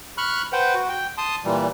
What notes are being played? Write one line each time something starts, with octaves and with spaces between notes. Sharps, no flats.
B5 C#6 F6 F#6
B4 C5 F#5 G5
F#4
G5
A5 C6 D#6
A#2 E3 G3